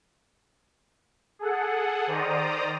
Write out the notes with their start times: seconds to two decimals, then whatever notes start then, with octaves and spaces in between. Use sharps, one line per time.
1.39 G#4 A4 F#5
2.07 D#3 C5 D5 A#5 D#6